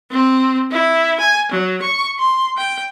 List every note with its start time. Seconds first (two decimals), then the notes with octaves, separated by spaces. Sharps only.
0.11 C4
0.71 E4
1.20 G#5
1.51 F#3
1.82 C#6
2.19 C6
2.58 G5